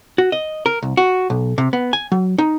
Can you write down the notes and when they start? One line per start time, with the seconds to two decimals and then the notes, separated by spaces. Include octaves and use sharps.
0.18 F#4
0.32 D#5
0.66 A#4
0.83 C2
0.97 F#4
1.30 B1
1.58 C3
1.73 B3
1.93 G#5
2.12 F#3
2.38 D#4